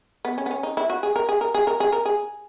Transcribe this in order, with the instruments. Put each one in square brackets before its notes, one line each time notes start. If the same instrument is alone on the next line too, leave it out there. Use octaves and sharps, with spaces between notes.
[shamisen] B3
C#4
B3
C#4
D#4
E4
F#4
G#4
A#4
G#4
A#4
G#4
A#4
G#4
A#4
G#4